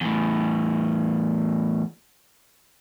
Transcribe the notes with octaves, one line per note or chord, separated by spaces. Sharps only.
E2 A2